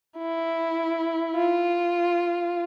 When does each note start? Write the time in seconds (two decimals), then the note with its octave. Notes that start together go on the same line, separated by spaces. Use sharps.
0.18 E4
1.36 F4